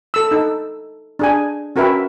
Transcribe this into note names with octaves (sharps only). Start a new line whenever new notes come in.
A4 E6
D#4 A4
D4 G#4 G#5
C#4 F#4 A#4 B4 E5 G5